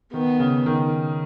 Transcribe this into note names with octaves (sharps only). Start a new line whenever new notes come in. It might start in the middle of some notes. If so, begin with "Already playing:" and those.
D#3 B3
C#3
D#3